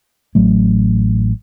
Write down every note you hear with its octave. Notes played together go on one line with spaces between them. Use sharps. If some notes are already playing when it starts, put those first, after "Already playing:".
A1 F#3 A3